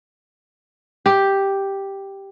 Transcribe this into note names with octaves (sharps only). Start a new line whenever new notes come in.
G4